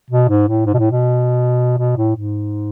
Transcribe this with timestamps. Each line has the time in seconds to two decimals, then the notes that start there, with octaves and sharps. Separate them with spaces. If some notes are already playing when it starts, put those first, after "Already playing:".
0.11 B2
0.29 G#2
0.48 A2
0.66 G#2
0.74 B2
0.79 A2
0.91 B2
1.78 B2
1.97 A2
2.16 G#2